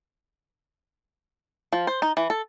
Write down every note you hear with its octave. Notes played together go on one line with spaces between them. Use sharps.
F3
C5
D#4
E3
A4